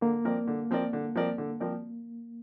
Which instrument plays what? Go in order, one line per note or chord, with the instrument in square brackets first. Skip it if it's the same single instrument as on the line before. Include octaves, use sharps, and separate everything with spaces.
[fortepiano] D3 [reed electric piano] A#3
[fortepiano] F3 C4 A#4 D5
D3
F3 C4 A#4 D5
D3
F3 C4 A#4 D5
D3
F3 C4 A#4 D5